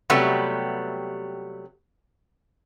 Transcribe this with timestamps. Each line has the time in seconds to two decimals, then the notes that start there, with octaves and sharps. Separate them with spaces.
0.10 C3 F#3 G3 A3 B3